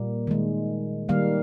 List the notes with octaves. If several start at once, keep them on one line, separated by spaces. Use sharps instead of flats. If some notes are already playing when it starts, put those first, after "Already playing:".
Already playing: A#2 G3 A#3
D#3 G#3
D#3 G3 A#3 F5